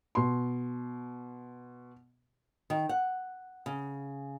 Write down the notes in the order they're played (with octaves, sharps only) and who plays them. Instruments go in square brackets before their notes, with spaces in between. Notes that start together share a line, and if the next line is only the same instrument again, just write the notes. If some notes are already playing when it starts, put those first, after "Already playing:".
[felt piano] B2 C6
[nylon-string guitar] D#3
F#5
C#3